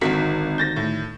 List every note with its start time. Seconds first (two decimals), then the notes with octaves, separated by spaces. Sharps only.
0.01 G#1 D3 D#3 F#4 B6
0.58 G6 A6 A#6
0.76 A2